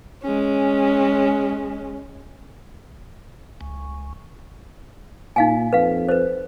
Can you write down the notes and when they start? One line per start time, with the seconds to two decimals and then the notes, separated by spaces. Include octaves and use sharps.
0.23 G#3 C#4
3.61 C#2
5.36 A#2 D#4 F5 G#5
5.73 F2 B4 F5
6.09 B4 C5